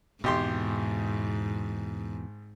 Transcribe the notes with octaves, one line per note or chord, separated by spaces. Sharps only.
G#1 E2 G#2 B2 G4 C6